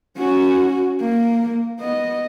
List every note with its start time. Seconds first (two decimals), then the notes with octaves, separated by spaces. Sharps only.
0.17 C#4 F#4
1.00 A#3
1.80 B3 D#5